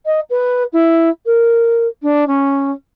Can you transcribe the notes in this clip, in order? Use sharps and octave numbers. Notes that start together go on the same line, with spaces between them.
D#5
B4
E4
A#4
D4
C#4